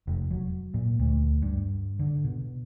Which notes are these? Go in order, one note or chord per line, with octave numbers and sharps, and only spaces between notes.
F1
F#3
A#2
D2
G2
D3
B2